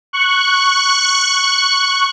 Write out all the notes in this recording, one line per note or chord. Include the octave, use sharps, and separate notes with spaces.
C#6 F#6